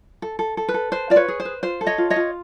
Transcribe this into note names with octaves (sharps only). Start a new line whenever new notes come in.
A4
A4
A4
B4
A4
B4 C5
F4 D5
B4 C#5
G#4
C5
B4
F4 C5
A4
C#5 D#5
F4
C#5 D#5
F4